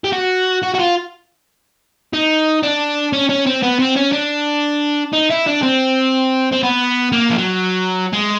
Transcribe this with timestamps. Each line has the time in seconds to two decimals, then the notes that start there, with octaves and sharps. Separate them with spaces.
0.04 G4
0.13 F#4
0.63 F#4
0.75 F#4
0.80 F4
2.13 D#4
2.63 D4
3.13 C#4
3.29 C#4
3.46 C4
3.63 B3
3.79 C4
3.96 C#4
4.12 D4
5.13 D#4
5.30 E4
5.46 D4
5.62 C4
6.52 C4
6.63 B3
7.12 A#3
7.30 F3
7.38 F#3
8.13 G#3